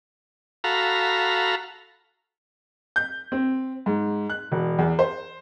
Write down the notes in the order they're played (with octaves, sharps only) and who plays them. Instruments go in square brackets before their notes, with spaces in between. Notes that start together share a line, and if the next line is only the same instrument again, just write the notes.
[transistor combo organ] F#4 A4 F5 A#5 B5
[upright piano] G6
C4
G#2
F#6
E1
E2
C5